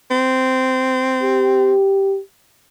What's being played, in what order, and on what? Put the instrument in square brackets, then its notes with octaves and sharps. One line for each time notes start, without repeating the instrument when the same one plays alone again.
[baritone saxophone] C4
[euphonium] G4